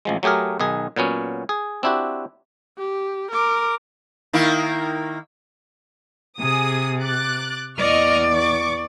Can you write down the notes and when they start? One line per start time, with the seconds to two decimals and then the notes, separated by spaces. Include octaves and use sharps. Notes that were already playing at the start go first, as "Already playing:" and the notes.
0.05 A1 F3 G#3
0.23 F#3 A3 G4 G#4 A#4
0.60 B1 D#3 G#4
0.96 A#2 F#3 B3 C#4
1.49 G#4
1.83 C4 D4 E4 F#4 G4
2.78 G4
3.31 A#4 D6
4.33 D#3 A#3 E4
6.39 C3 G#4 D#6
7.02 D6 F#6 A6
7.78 E2 D5 D#5 C#6 F6
8.32 C#6 D6